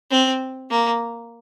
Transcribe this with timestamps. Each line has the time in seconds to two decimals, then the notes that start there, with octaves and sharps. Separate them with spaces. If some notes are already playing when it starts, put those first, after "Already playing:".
0.11 C4
0.70 A#3